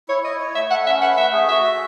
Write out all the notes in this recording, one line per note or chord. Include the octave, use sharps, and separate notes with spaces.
E4 C#5
E4 D#5
C#5
A3 E5
A4 F#5
C#4 E5
B4 F#5
A3 E5
G#4
F#4 E5
E5